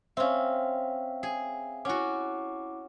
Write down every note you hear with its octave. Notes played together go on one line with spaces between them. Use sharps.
C4 C#4 E5 F5
G#4
C#4 E4 F#4 F#5 D6